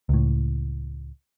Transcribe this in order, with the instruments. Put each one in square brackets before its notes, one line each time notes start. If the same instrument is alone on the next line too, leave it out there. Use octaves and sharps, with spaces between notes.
[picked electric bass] C#2 A2